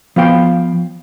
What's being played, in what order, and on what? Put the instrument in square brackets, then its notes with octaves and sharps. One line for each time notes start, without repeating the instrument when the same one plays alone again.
[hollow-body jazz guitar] F3 B3 F5 G5